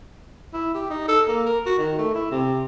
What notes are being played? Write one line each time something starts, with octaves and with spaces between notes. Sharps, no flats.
E4
G4
D#4
A4
A#3
A#4
F#4
D#3
A3
E4
C3